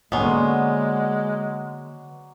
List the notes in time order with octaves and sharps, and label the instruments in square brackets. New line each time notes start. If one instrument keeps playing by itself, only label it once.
[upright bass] D3 A#3 [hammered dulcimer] F#3 D5 C6 [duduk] G#3 [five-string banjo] B3 C#4